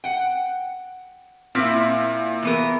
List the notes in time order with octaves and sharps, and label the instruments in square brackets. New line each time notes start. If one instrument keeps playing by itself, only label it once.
[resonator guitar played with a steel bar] F#5 G5
[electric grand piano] A#2 F6 B6 [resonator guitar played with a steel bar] C4 E4
[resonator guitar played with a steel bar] E3 B3 A#4